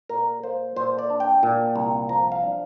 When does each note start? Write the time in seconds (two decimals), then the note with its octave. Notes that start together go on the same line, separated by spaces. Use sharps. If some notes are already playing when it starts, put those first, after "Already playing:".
0.09 A#2 A#4
0.43 A#3 C5
0.76 A#2 C5
0.99 D5
1.10 D4
1.20 G5
1.43 A#2
1.76 C2
2.09 F3 A#5
2.32 F5
2.43 D4